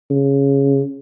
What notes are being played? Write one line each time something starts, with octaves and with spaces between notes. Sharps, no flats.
C#3